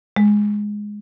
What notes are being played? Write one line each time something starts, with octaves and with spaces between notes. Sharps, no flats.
G#3